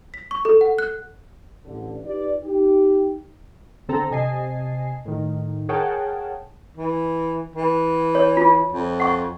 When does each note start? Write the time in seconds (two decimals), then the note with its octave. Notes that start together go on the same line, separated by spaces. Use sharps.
0.14 B6
0.31 C#6
0.45 A4
0.61 F#5
0.78 F#6
1.65 A1 D3
2.05 D#4 F4 G4 B4 D5
2.43 D#4 G4
3.89 D3 C4 A4 A#5
4.11 C3 D#5 G#5 A5 C7
5.05 A2 D#3
5.69 G#4 A#4 C#5 F#5 G5 A5
6.77 E3
7.56 E3
8.15 C#5
8.37 F4
8.72 F2
9.00 F#5 C#6